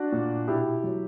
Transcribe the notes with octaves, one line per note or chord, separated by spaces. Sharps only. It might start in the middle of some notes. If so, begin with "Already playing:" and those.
Already playing: D4 F#4
A#2
B2 E4 G4
F#3